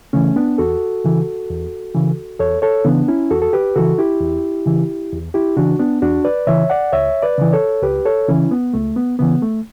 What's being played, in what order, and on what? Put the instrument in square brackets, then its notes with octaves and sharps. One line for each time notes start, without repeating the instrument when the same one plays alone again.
[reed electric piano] C#3 E3 A3 C#4
B3 D4
E2 F#4 A4
C#3 E3
E2
C#3 E3
E2 A4 C#5
A4 C#5
C#3 E3 B3 D4
C#4 E4
E2 F#4 A4
A4
G4 B4
C#3 E3 F#4 A4
E4 G4
E2
C#3 E3
E2
E4 G4
C#3 E3 D4 F#4
B3 D4
E2 D4 F#4
B4 D5
C#3 E3 C#5 E5
D5 F#5
C#2 C#5 E5
B4 D5
C#3 E3
A4 C#5
C#2 G4 B4
A4 C#5
C#3 E3 C#4 E4
B3
C#2 A3
B3
C#3 E3 B3
A3